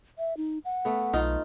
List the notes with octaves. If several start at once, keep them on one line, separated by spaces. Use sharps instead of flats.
E5
D#4
F#5
A3 B3
B1 D#4 F4